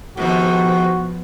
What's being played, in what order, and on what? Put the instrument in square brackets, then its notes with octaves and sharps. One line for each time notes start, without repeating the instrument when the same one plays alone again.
[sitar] G#2 C3 D#3 [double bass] F3 B3 [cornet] F#4